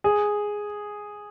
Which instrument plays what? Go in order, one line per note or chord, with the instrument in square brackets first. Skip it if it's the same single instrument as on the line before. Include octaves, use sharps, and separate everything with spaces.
[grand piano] G#4